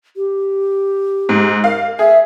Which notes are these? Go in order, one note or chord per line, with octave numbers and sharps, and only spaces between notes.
G4
G#2
A#4 F5
G#4 E5